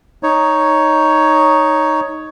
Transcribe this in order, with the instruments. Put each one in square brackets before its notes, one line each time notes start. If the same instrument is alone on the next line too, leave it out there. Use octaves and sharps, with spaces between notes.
[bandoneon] D#4 C#5